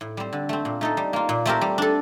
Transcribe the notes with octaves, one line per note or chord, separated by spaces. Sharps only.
A2
G3 C4
D3
A3 C4
A#2
A3 D#4 A4
G3
A#3 F4
A#2
A3 C4 G4 A#4
G3
D4 A4